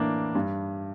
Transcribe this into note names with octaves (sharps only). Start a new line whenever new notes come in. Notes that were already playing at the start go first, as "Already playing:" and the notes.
Already playing: A2 E3 A#3 D4
G2